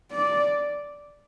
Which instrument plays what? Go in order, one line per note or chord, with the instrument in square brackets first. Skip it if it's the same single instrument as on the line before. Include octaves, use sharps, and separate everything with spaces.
[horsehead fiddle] D5